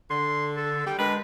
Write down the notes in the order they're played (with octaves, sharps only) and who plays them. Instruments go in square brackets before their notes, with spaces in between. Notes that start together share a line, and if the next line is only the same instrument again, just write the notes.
[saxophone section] D3 [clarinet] C6
[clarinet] A4
[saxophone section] G3 [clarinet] G5
[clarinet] G#3 [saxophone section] D4 A#4 B4